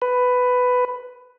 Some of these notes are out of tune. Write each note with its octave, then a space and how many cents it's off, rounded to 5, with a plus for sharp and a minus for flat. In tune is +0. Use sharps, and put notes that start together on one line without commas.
B4 +10